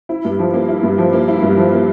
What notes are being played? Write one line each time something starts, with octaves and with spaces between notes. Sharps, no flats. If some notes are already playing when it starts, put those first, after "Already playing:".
E4
G2
F3
A#3
E4
G2
F3
A#3
E4
G2
F3
A#3